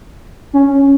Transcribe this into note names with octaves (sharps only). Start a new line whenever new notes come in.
C#4